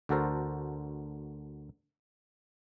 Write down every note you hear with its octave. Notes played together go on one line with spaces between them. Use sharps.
D2 D3 F#4 A4 A#4 C5